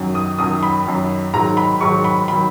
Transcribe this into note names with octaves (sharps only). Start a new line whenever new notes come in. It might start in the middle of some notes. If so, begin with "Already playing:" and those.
Already playing: F#2 D#3 F#3
D#6
F#2 D#3 F#3 D#6
B5
F#2 D#3 F#3
G#2 D#3 F#3 A#5
B5
G#2 D#3 F#3 C#6
B5
D#3 F#3 B5